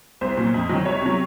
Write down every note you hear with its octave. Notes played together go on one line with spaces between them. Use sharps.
C2 C5
A#2 F#3
F2
D#3 F#3
C2 C#5
C3 F#3